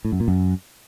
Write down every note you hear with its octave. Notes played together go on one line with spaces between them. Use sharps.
A2
F#2
A#2
F#2